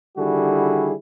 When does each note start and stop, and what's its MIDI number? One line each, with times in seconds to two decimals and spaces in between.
0.17 0.93 50
0.17 0.93 51
0.17 0.93 55
0.17 0.93 64
0.17 0.93 66
0.17 0.93 68